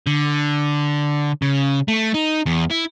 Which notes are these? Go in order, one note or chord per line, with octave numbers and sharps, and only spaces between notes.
D3
C#3
A3
D#4
E2
E4